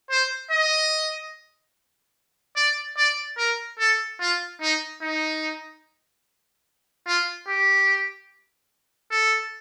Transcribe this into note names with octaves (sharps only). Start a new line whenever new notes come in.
C5
D#5
D5
D5
A#4
A4
F4
D#4
D#4
F4
G4
A4